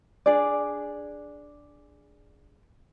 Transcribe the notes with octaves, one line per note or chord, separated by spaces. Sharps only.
D4 G#4 D5